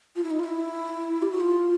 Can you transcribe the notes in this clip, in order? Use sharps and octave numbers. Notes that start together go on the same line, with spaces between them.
F4
E4
D#4
F4
E4
G4
F#4
F4